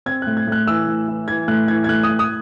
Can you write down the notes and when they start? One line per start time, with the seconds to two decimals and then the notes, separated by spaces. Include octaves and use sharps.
0.06 C4 G#6
0.22 F#6
0.27 A2
0.37 G#6
0.47 A2 F#6
0.67 E3 E6
0.88 A2
1.08 E3
1.28 E3 G#6
1.48 A2 F#6
1.68 E3 G#6
1.84 G#6
1.89 A2 F#6
2.03 D#6
2.09 A2
2.19 D#6